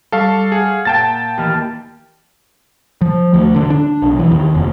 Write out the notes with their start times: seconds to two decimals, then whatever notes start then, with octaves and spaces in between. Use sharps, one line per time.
0.12 G3 A4 F5 C#6 D6
0.52 G#4 F5 F#5
0.85 A#2 G5 A5 A6
1.38 D#2 E3 F6
3.01 F3
3.34 D2
3.56 D3
3.70 D4
4.02 B1
4.19 E3
4.31 D#2
4.54 F1